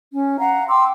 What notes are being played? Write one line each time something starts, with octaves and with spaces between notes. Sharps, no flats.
C#4
F5 F#5 A#5
G5 C6 D6 E6